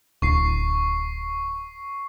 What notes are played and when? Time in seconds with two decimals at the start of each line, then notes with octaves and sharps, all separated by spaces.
0.22 D1 C#6 C7